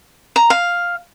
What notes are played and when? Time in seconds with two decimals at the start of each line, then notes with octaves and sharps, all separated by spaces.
0.36 A#5
0.50 F5